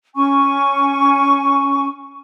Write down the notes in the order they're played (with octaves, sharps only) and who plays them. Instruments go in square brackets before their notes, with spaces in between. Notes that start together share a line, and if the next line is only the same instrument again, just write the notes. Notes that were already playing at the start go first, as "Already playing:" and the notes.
[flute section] C#4 G#5 C#6